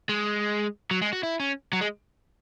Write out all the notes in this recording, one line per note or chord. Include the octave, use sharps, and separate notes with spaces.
G#3
F#3
G#3
F#4
E4
C#4
F#3
G#3